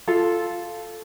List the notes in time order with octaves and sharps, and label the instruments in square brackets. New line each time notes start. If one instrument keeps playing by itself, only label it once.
[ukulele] F4 A4